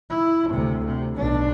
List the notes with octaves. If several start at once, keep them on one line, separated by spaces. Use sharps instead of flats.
E4
D2 C3
C3
B1 D4